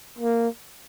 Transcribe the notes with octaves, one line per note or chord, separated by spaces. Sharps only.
A#3